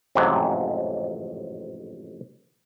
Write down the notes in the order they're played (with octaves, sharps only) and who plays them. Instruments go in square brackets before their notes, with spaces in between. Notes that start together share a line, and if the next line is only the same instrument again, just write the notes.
[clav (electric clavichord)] A1 F2 G#2 C3 F#3